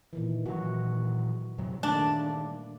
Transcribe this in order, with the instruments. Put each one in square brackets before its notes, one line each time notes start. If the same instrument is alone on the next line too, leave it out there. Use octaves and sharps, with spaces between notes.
[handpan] A#2 D#3 E3
[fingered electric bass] A#2 E3 F#3 [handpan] F#4
[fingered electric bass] F2 C3 F#3
[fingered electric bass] G2 D#3 [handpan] A3 A#3 D5 [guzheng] D4 [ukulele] A5